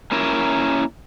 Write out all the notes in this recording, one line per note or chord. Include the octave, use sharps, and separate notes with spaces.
A#3 C#4 E4 A#4